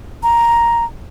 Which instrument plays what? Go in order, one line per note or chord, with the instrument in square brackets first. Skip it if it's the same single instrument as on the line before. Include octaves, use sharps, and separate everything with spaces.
[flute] A#5